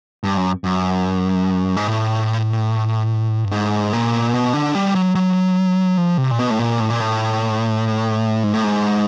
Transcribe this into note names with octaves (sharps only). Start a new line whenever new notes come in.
G2
F#2
F#2
G#2
A2
G2
G#2
A#2
B2
D3
G3
F#3
F#3
F3
C3
A#2
B2
A2
A#2
A2
A#2
A2
G#2
A2
G#2